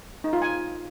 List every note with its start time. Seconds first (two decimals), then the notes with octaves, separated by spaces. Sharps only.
0.24 D#4
0.33 F4
0.42 G#5